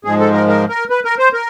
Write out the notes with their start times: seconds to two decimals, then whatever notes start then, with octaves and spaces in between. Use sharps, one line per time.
0.05 G#2 F3 G#3 G#4
0.19 A4
0.33 A#4
0.48 A#4
0.69 A#4
0.90 B4
1.05 A#4
1.19 C5
1.33 A#4